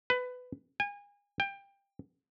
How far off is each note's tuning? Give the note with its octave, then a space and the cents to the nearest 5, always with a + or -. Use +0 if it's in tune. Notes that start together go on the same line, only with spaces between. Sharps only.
B4 +20
G#5 -35
G5 +20